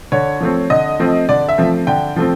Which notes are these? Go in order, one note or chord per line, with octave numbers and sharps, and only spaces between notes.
D3 C#5
F3 A3 C4
D3 D#5
F3 A3 C4
D3 D5
E5
F3 A3 C4
D3 G5
F3 A3 C4